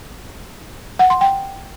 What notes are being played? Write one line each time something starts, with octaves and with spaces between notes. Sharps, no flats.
F#5
C6
G5